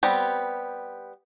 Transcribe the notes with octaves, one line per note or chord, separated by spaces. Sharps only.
G3 B3 C4 G4